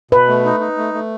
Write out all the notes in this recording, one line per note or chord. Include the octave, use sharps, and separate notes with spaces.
B2 B4
A3
D#4
D#4
A3
A3